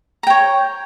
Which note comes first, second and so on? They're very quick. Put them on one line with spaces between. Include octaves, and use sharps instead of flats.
A#5 G5 C#5